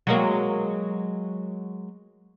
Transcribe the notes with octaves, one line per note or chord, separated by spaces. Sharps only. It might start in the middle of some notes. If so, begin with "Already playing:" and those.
F#3 G#3 A#3